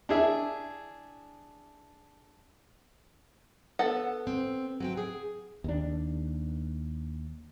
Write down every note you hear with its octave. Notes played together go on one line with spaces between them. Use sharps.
D4 E4 G#4 E5
B3 A4 F#5
C4
F#3 C4 G5
G#4
D#2 D4